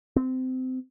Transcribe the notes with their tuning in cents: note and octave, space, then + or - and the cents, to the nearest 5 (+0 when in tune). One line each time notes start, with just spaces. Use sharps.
C4 -25